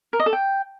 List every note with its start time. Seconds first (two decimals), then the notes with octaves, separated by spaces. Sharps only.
0.13 A#4
0.20 D#5
0.26 A4
0.33 G5